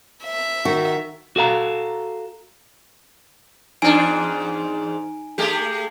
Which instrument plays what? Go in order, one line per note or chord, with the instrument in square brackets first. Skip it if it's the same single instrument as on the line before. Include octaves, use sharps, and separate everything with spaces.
[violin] E5
[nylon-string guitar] D#3 F#4
[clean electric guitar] F#4 A4 F5 A#5
[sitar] E2 G#2 D4 [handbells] D#4 G#5 D7
[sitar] G#3 A3 G4